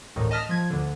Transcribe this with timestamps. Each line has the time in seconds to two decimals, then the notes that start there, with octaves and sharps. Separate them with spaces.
0.16 A1 D2 A2 D#3
0.31 D#5 A5 D#6 F6 A#6 B6
0.49 F3 G#6
0.70 D2 D3